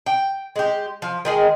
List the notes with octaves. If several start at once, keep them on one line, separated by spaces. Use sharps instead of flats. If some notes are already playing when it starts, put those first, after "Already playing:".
G5
G#3 G4
F3
D#3 G#3 G#4